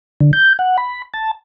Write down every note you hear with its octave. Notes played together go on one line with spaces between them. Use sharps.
D3
G6
F#5
B5
A5